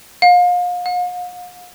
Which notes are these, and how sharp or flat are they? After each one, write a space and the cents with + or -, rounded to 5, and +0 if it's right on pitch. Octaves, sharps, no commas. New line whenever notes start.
F5 +35
F5 +45